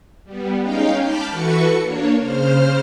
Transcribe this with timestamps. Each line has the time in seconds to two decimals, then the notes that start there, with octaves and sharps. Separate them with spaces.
0.24 G3 B3
0.62 G#3 C#4 D#4 F5 G5
0.99 A5 B5 D6 F6 G6
1.29 E3 F#4 A4 B4 C#6 C#7
1.80 A#3 D4 C#5
2.20 C#3 C5 F6